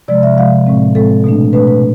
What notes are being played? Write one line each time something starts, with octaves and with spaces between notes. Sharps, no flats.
C3 F3 G#3 D5
E5
C3 F3 G#3 F5
A2 G#3 C4
A2 G#3 C4 A4
B2 A3 D4
B2 A3 D4 B4
B4